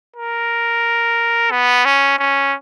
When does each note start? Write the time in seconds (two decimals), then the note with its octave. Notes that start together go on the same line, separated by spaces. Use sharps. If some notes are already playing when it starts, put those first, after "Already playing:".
0.16 A#4
1.51 B3
1.85 C#4
2.19 C#4